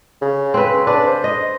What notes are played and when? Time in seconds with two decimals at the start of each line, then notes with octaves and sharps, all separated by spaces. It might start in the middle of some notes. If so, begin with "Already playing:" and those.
0.22 C#3
0.54 C4 B4
0.73 C#3
0.87 D4 B4
1.07 C5
1.24 D#5